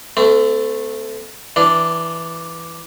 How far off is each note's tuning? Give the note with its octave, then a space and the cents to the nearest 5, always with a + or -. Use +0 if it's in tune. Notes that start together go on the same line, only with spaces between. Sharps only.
A3 +0 C4 -40
E3 +0 D4 +0